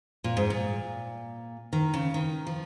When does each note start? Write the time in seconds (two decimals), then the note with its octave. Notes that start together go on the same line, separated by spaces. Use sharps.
0.24 A#2
0.37 G#2
0.50 A#2
1.73 D#3
1.94 C#3
2.14 D#3
2.47 F3